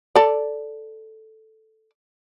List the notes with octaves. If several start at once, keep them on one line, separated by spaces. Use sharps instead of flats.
A4 D5